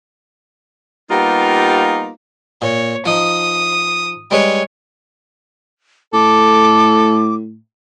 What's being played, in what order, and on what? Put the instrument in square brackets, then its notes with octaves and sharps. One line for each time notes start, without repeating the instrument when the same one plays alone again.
[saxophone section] G3 A#3 B3 D#4 F4 G4
[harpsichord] A#2 [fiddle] C#5
[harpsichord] F3 D#4 [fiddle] D#6
[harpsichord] G3 G#3 B4 [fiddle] C#5
[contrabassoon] A2 [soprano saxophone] A4 [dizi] D6